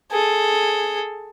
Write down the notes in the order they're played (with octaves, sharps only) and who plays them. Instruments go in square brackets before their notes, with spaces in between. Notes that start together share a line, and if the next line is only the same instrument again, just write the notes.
[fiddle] G#4 A4